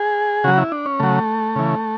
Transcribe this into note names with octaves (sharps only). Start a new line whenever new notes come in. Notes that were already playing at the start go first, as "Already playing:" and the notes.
Already playing: G#4
C#3 F#3 F#4
E4
D4
C#4
C#3 F#3 A3
C#3 E3